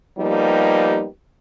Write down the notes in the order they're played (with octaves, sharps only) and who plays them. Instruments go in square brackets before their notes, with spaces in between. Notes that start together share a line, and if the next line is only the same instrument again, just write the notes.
[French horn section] F3 G3 A#3 B3 D#4 G4